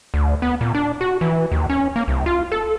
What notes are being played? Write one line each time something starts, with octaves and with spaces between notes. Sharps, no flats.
D2
B3
A#2
D4
F#4
E3
D#2
C#4
A#3
C2
F4
A4